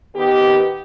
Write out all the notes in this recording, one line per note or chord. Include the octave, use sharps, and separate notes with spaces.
D#3 B3 G4